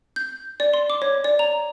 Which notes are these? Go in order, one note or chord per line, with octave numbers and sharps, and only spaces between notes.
G6
D5
C6
D6
C#5
D5
A#5